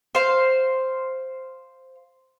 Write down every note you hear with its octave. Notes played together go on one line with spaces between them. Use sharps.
C5 F5